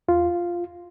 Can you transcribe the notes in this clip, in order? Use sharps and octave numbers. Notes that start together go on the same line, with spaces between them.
E2 F4